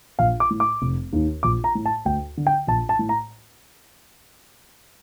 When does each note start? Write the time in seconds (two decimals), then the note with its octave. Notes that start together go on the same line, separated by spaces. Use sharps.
0.19 A#1 F5
0.40 D6
0.51 A2
0.60 D6
0.82 F1
1.13 D#2 D#3
1.43 A#1 D6
1.64 A#5
1.75 A2
1.86 A5
2.05 D2 G5
2.37 D3
2.47 G5
2.67 A#1 A5
2.89 A5
2.99 A2
3.09 A#5